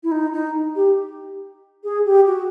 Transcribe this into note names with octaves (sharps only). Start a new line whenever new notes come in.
E4
D#4
D#4
G4
G#4
G4
F#4